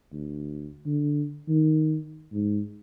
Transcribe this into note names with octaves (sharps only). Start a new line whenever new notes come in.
D2
D3
D#3
G#2